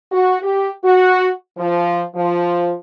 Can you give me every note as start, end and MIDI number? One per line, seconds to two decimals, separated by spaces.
0.11 0.38 66
0.41 0.69 67
0.84 1.29 66
1.57 2.02 53
2.15 2.72 53